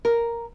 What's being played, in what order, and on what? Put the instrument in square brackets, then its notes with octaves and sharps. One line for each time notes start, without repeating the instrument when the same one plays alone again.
[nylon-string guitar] A#4